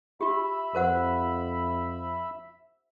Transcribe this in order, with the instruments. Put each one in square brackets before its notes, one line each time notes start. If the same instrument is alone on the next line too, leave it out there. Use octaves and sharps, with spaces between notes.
[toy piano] F4 G4 [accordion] E5 B5
[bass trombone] F2 [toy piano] A#4 C5 F#5